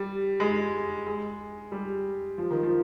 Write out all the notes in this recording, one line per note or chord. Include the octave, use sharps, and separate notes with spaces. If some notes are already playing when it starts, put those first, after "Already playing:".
Already playing: G3
G#3
G#3
G3
F3
D#3
F3